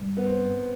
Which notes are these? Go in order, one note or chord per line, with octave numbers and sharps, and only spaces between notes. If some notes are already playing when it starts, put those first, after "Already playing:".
Already playing: G2
B3
C4